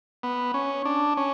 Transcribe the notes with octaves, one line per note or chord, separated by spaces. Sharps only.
B3
C#4
D4
C#4